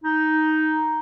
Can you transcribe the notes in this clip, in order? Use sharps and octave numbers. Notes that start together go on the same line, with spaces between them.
D#4